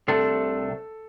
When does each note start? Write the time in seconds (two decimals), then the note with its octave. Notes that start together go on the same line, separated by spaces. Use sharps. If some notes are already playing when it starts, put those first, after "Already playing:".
0.08 C2 C3 A3 D4 A4